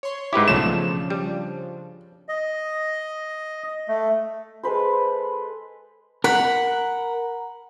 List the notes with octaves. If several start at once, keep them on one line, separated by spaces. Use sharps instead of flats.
C#5 C6
G#2 E4 G4 B4 D6
B1 C#3 F3 A3 D4 C#5 E7
G3
D#5
A3
G#3 A4 B4 C5
A#4 F#5 B5